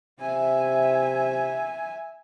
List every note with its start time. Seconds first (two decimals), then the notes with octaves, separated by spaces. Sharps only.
0.20 C3 E5 G#5